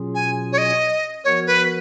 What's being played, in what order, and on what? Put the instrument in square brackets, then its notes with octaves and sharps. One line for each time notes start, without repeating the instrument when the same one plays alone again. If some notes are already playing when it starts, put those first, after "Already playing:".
Already playing: [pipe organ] B2 F#3 C#4 F4 G#4
[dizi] G#5
C#5
D#5
[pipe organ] F3 B3 F#4 A#4 [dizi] C#5
[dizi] B4